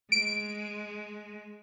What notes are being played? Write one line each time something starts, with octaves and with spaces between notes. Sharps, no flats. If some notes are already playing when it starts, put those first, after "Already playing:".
G#3 D7